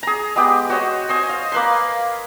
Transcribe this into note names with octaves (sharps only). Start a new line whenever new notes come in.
G#4 A#5
G#3 B3 G4
F#4 C5 C#5 D#5
C5 D#5 G#5
F5
A#3 B4 C6